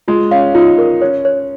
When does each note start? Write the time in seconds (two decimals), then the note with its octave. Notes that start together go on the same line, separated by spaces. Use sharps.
0.08 G#3 F4
0.31 C#4 F5
0.55 D#4 F4
0.78 A#4
1.02 C#4 C#5
1.25 C#5